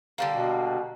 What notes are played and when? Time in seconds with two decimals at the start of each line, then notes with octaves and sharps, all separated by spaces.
0.18 D3 G3 A#3
0.33 B2